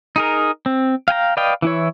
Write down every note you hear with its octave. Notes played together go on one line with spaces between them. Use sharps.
D#4 G#4 A#4
C4
F5 G5 G#5 A#5
B4 D5 D#5 F5 G5
E3 E4 C#5